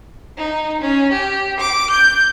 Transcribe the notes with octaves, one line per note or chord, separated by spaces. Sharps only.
D#4
C#4
G4
D6
G6